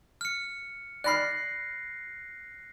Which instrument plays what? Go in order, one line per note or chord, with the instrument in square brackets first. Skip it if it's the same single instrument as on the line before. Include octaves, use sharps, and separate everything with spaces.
[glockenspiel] F6 C#7
[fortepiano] D5 B5 F6 [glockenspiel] F#6 A#6 C7